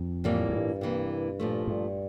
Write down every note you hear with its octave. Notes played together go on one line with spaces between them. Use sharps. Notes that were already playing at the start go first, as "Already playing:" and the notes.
Already playing: F2
A2 E3 G3 A#3 F4
F2
G2
C3 E3 A#3
A#2 F3 A3
G2